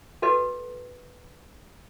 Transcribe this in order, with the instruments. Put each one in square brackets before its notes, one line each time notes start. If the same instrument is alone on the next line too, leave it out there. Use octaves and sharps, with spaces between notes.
[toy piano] F#4 A4 B4 D#5